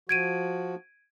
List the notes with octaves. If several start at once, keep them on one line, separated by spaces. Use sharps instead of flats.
F3 F#4 G#6 D7 D#7